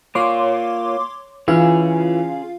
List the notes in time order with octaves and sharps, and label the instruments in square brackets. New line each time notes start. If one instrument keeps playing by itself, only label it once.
[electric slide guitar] A#3 F4 [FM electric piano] C#5 C6 D6
[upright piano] E3 [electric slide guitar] C#4 G#4 [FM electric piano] F4 F5